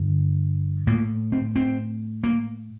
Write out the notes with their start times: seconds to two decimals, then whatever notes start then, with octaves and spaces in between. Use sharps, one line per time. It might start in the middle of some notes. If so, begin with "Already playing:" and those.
Already playing: G2 D3
0.87 A2 A#3
1.32 C4
1.56 C4
2.24 A#3